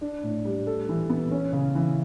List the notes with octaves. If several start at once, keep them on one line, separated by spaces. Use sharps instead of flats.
D4
A2
G3
A4
E3
B3
C#4
C#3
E3